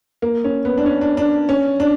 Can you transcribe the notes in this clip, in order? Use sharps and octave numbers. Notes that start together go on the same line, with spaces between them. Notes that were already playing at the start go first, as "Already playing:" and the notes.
A#3
C#4
B3
D4
C#4
D4
D4
C#4
D4